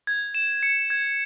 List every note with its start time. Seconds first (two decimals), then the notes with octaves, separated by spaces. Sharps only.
0.07 G#6
0.35 E7
0.63 C#7
0.90 G#6